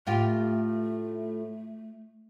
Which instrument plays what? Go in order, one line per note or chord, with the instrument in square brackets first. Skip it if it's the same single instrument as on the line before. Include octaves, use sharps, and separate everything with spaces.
[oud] A2 F4 G4 [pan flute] A3